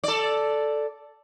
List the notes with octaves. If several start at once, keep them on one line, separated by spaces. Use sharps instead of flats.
A4 D5